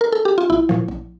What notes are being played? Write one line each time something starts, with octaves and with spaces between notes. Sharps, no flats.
A#4
A4
G4
F4
A#1 E4
A#2 F3
A#1